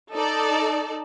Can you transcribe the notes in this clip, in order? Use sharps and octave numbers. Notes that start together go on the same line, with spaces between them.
D#4 A4 D5